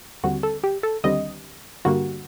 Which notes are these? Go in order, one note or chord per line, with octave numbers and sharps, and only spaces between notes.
D#2 D3 G3 C4 F#4
A4
G4
A4
D#2 D3 G3 C4 D#5
G2 D3 G3 A#3 F#4